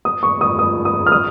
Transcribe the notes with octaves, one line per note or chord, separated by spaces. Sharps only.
D#6
C#6
D#6
D#6
D#6
F6
D#6